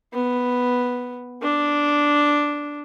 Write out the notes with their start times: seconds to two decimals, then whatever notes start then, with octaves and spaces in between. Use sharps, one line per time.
0.13 B3
1.42 D4